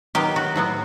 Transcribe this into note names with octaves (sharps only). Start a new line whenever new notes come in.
D#3 F#3 B3 G4
F#4
A2 F#3 B3